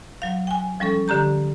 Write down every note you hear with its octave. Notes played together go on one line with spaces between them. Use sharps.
F#3 F5
G5 G#5
F3 G3 C#4 A4
D3 G4 A#5 G6